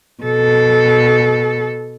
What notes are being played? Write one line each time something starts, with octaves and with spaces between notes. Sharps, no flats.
B2 A4